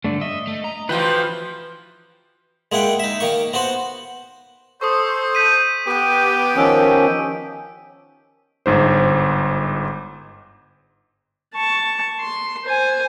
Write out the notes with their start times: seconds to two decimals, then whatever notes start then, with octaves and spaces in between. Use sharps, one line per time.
0.04 G2 D3 A3
0.21 D#5 E5
0.47 A3
0.64 A#5
0.89 E3 F3 F4 F#4 B4 G5
2.72 G#3 A#3 E4 F#5 G5
3.00 D#4 E5
3.20 D#3 A#3 C#6
3.53 B3 F#4 C5 F#5
4.81 A4 C5 C#6 D#6
5.35 G6 B6 D#7
5.87 B3 G4
6.56 D#3 F3 C#4 E6 D7
8.66 G1 G#2 C5
11.55 A5 C#6
12.21 C6
12.66 C5 G#5